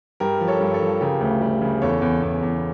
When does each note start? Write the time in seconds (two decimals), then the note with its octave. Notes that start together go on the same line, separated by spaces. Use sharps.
0.20 G2 G4 A#4
0.41 F3
0.48 A4 C#5
0.60 G2
0.74 A4 C#5
0.82 F3
1.01 C#3 G4 A#4
1.21 D2
1.41 G3
1.62 C#3
1.82 E2 A4 C#5
2.01 E2
2.22 E2
2.42 E2